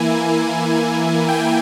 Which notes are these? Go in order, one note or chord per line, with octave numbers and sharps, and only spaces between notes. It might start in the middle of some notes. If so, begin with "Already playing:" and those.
Already playing: E3 A#3 E4 G#5
G5